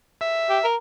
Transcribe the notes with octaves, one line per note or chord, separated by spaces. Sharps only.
E5
G4
A#4